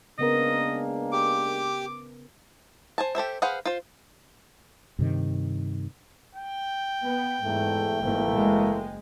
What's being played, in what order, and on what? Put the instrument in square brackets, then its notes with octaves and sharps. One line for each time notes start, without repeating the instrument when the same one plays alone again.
[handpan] C#3 B3 A#4 [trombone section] G#3 A#3 D4 [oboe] D#5
[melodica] G4 [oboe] D6
[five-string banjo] C5 G#5 A5
G4 A4 C5 E5
G#4 B4 C5 F5 F#5
F4 C5
[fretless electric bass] G2 C3 D#3
[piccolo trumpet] G5
[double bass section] B3
[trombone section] E2 A3 [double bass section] G#2
[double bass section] G1 G#2 [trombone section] E3 A3 A#3
[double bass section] F#1 G#3